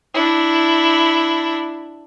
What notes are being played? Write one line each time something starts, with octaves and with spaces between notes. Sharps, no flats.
D4 E4